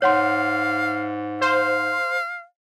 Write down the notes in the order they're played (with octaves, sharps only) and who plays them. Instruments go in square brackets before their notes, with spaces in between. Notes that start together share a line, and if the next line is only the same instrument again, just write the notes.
[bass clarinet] G#2 [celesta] C#5 F#5 C6 [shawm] F5
[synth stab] C5 [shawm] F5